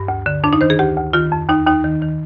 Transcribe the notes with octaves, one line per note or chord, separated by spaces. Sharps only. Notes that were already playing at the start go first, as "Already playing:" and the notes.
Already playing: G2
D2
D3
F2 D4
D#4
D#3 C5
G#4
D2 G4
D2
D#3 F4
F2
D#2 D#4
D#2 D#4
D#3
D#3